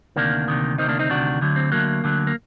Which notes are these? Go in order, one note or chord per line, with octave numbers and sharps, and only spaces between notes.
D2 C3 D#3 A#3 D4
D2 C3 D#3
D2 C3 D#3 C4 D#4
A#3 D4
C4 D#4
D2 C3 D#3 D4 F#4
D2 D3 F#3
C4
D2 D3 F#3 A#3
D2 D3 F#3
A#3